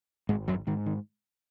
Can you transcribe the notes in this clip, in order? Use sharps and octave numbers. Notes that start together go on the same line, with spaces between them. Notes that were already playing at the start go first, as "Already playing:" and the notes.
G#1 G#2 G#3
F#2 F#3
G#2 D#3
D#3